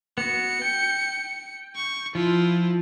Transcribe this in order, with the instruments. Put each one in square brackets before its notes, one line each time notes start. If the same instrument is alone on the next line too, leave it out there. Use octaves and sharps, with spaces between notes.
[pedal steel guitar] B3 F#4 [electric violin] C#7
[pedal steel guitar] G5
[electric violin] C#6
[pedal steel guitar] F3 [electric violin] E4 F4